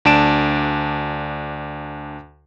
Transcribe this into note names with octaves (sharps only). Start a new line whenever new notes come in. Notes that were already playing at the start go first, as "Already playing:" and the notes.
D2 D4 A5 D7 E7